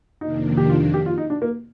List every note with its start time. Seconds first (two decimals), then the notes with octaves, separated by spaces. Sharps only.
0.21 F2 C3 D#3 A#3 D4 D#4
0.57 G4
0.70 F4
0.94 G4
1.06 F4
1.18 D#4
1.30 D4
1.42 A#3